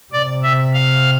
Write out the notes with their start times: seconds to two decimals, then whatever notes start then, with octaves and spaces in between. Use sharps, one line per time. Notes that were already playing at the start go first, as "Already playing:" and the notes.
0.13 C3 D5
0.43 E5
0.74 F5